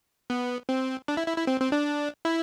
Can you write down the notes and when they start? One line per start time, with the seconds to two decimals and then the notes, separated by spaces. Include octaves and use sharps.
0.30 B3
0.69 C4
1.08 D4
1.17 E4
1.27 E4
1.37 E4
1.47 C4
1.60 C4
1.72 D4
2.25 E4